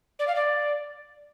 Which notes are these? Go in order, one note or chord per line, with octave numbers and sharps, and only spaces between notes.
D5
F5
D5